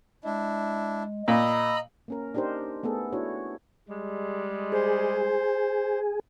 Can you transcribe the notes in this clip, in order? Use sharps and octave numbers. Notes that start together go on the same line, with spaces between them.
G#3 D4 E4
A#2 D#5 A#5 B5 E6
A#3 C#4 A#4
D4 D#4 G4 A#4 C5
A3 B3 G#4 A4
D4 E4 F#4 C#5
G3 G#3
G#4 C5